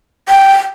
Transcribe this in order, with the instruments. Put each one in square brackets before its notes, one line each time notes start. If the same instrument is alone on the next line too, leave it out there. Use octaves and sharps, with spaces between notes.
[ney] G5